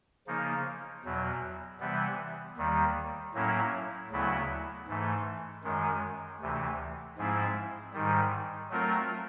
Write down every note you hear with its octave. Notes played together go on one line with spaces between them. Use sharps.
C#3 F3 A#3 D#4
E2 B2 F#3
C3 E3 G3 B3
D#2 D#3 G3
A2 F#3 A#3 C#4 E4
D2 C#3 F#3 B3 E4
G#2 E3 A3
F#2 D#3 G#3
D2 C3 E3
G#2 F3 G#3 C4 E4
G#2 D#3 G3
F#3 A3 C4 F4 A#4